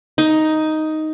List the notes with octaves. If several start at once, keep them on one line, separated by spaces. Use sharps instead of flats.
D#4